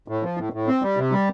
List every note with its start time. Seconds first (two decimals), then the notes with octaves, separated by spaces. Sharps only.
0.08 A2
0.23 F3
0.38 A2
0.53 A2
0.67 C4
0.82 G3
0.97 C3
1.12 G3